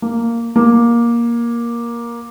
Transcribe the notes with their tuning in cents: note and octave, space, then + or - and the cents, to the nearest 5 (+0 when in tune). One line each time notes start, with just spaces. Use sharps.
A#3 -5
A#3 +15